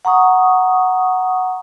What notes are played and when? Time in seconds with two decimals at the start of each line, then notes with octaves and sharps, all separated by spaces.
0.05 F#5 A#5 C#6 D#6